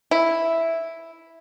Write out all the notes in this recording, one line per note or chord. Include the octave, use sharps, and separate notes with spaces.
E4